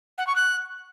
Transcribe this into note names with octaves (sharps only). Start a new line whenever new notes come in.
F#5
C#6
F#6